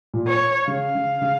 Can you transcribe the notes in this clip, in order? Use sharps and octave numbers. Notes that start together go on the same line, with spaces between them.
A#2
C#5
C#3 F5
C#3
C#3